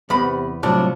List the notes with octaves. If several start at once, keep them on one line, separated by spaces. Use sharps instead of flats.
E2 C3 B3 B5
C2 A2 C3 F3 F#3 D4